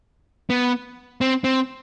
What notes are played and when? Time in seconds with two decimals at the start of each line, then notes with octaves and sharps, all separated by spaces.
0.50 B3
1.21 C4
1.44 C4